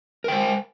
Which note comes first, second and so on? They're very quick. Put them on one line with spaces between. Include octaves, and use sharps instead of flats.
A#4 G5 C5